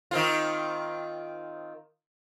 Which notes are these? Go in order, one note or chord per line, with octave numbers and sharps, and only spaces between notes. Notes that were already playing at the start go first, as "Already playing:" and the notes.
D#3 C4 F4